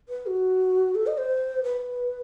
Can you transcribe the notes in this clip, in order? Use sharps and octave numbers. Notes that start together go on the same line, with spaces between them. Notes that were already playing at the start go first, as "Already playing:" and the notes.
B4
F#4
A4
D#5
C5
B4